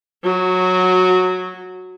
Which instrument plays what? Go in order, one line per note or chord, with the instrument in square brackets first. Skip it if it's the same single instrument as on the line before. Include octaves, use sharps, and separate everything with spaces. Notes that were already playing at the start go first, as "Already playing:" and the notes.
[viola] F#3 F#4